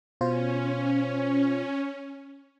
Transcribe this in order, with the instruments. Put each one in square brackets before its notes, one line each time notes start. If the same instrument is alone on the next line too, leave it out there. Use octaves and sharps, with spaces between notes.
[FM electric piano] B2 F4 C5 [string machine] C#4